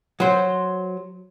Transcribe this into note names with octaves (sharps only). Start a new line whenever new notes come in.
F#3 C5